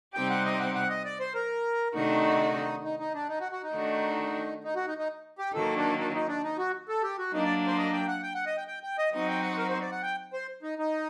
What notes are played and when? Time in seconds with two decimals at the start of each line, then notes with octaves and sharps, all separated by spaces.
0.14 C3 G3 C4 D#4 G4 G5
0.30 F#5
0.45 D#5
0.60 F#5
0.75 F#5
0.89 D#5
1.05 D5
1.20 C5
1.34 A#4
1.95 C3 D#3 A3 D4 D#4 F#4
2.84 D#4
2.99 D#4
3.14 D4
3.29 D#4
3.41 F#4
3.52 F#4
3.63 D#4
3.74 D#3 A3 D4 F#4
4.64 D#4
4.76 F#4
4.87 D#4
4.98 D#4
5.39 G4
5.54 D#3 F#3 A#3 A4
5.77 D4
5.99 D4
6.14 D#4
6.28 D4
6.44 D#4
6.58 F#4
6.89 A4
7.03 G4
7.19 F#4
7.33 F#3 A#3 D4 D#4
7.45 D5
7.67 C5
7.78 D#5
7.93 G5
8.08 F#5
8.23 G5
8.35 F#5
8.46 D#5
8.58 G5
8.68 G5
8.83 G5
8.98 D#5
9.13 F#3 C4 D#4 F#4 D#5
9.28 G5
9.43 F#5
9.58 A#4
9.69 C5
9.81 D5
9.92 F#5
10.03 G5
10.33 C5
10.63 D#4
10.78 D#4